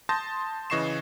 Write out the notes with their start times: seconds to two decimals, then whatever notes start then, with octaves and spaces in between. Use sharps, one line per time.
0.09 A5 C6 D#6 G6 A6 A#6
0.70 C#3 E3 D#5 C#6 C7 E7